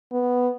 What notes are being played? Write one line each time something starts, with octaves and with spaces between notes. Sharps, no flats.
B3